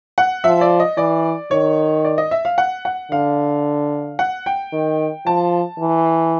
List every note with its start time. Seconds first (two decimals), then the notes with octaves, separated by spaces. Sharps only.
0.18 F#5
0.44 F3 E5
0.61 D5
0.80 D#5
0.97 E3 D5
1.51 D#3 C#5
2.05 D5
2.18 D#5
2.31 E5
2.45 F5
2.58 F#5
2.85 F#5
3.11 D3 F5
4.19 F#5
4.46 G5
4.72 D#3
5.26 F3 A5
5.79 E3